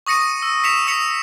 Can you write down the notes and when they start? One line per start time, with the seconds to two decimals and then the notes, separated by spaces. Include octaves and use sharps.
0.07 C#6 D#6 A#6 C#7 D#7
0.42 E6
0.64 B6 C#7 E7 F7
0.87 D#6 B6 C#7 F7